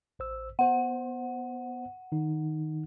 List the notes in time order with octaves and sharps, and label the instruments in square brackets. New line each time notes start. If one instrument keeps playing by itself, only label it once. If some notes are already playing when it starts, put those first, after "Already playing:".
[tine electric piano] A1 C5 E6
[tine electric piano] B3 C5 [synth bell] F#5
[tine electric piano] D#3 D#4